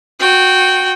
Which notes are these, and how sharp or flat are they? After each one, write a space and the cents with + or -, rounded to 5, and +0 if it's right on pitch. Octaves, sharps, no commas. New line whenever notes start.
F#4 -15 G5 -15